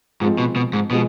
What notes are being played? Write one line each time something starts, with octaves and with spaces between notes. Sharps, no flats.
G#2 F3 G#3 C4
B2
B2
G#2
B2 F3 G#3